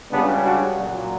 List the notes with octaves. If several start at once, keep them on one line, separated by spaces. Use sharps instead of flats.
C#2 C#3 G3 B3 D4
D4 F#4
A#2 F#3